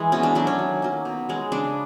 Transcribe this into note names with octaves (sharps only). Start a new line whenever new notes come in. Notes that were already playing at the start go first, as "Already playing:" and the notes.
Already playing: E3 G#3
B2 C#4
D4
F#3 A3 D4
C#4
D#3
F#3 A#3
B2
G#3 C#4
C#3 D4